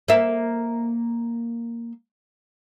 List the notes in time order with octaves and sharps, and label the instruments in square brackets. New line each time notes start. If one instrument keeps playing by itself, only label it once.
[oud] A#3 E5